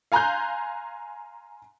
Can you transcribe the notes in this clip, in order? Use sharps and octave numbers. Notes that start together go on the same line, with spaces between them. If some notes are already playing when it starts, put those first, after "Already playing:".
F5 G#5 A#5 C6 F#6 G6